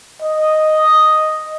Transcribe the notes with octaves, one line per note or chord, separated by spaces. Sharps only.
D#5